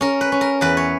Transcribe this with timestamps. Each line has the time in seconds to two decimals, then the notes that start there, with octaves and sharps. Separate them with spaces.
0.01 C#4 A#4
0.21 B4
0.32 C#4
0.41 A#4
0.61 E2 B4
0.77 C#5